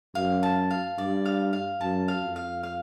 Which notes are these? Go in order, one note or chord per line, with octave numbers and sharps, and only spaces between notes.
F#2 F5
A5
F5
G2 D5
F5
F5
F#2 A5
F5
F2
F5
F5